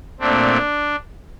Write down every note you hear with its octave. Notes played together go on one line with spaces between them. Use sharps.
A#2 A3 C4 D4